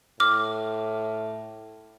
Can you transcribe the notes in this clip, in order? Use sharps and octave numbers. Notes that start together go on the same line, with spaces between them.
A2 D6 F6